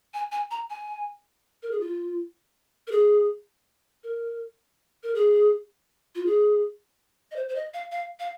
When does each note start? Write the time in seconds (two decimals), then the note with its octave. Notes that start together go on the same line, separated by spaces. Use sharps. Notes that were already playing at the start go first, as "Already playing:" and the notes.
0.14 G#5
0.32 G#5
0.51 A#5
0.70 G#5
1.63 A#4
1.71 G#4
1.80 F4
2.87 A#4
2.91 G#4
4.04 A#4
5.03 A#4
5.15 G#4
6.15 F4
6.26 G#4
7.31 D#5
7.36 C5
7.49 C5
7.55 D#5
7.74 F5
7.92 F5
8.20 F5